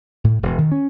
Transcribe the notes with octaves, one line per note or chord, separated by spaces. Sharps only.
A2
E1
D#3
C#4